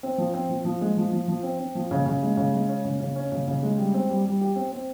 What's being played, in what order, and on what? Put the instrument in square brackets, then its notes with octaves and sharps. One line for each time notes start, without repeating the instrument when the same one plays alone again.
[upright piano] C4
F3
C4
F3
F3
G#3
F3
F3
F3
C4
C4
F3
C#3
C#3
G#3
C#3
G#3
C#4
C#3
C#3
C#4
C#3
C#3
G#3
G3
C4
G3
G3
G4
C4
C4